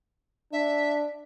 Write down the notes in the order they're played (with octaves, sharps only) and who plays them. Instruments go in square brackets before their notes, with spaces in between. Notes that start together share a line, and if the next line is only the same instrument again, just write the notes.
[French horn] D4 [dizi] E5